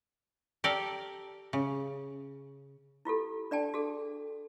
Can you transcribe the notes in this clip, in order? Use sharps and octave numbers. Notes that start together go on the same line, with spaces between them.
G4 A4 A#4 D5
C#3
E4 F4 G4 A4
D4 D5 G5 A5
F#4 G#4 A4